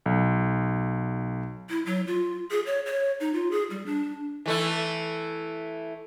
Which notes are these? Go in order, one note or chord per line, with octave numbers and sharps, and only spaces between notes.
B1
E4
F#3
F4
G#4
C#5
C#5
D#4
F4
G#4
G3
D4
E3 A3 E4